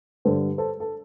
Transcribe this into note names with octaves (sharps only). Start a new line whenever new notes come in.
G2 D3 G3 A4 C5
A4 C5
A4